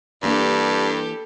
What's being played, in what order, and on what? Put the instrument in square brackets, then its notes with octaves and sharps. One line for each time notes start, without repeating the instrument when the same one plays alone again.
[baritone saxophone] G2 [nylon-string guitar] E3 A#3 D4 [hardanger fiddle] G4 A4